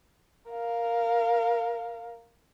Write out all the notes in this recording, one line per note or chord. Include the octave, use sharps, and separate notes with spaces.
A#4 F5